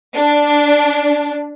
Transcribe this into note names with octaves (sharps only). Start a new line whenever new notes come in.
D4